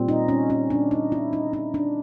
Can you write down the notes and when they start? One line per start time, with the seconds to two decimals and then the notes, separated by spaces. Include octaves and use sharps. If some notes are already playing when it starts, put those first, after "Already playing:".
Already playing: A#2 G3 C4
0.08 D#4
0.29 C#4
0.50 C#4
0.70 D4
0.91 D#4
1.12 E4
1.33 D#4
1.53 D#4
1.74 D4